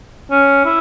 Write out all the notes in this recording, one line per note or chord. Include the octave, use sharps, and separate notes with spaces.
C#4
E4